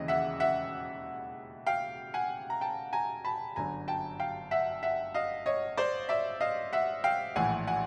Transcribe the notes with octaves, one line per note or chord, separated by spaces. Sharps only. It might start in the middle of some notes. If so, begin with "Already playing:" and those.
Already playing: E1 D#2 C#3 E3 D#5
E5 F#5
E5 F#5
F5 G5
F#5 G#5
A#5
G5 A5
G#5 A#5
A5 B5
G1 F#2 D3 G#5 A#5
G5 A5
F5 G5
E5 F#5
E5 F#5
D#5 F5
C#5 D#5
C5 D5
D5 E5
D#5 F5
E5 F#5
F5 G5
A#1 A2 E3 F#5 G#5
F#5 G#5